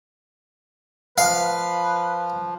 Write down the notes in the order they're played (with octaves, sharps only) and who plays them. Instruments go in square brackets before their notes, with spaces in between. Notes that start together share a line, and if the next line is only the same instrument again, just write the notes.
[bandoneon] F3 [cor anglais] B4 [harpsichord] F5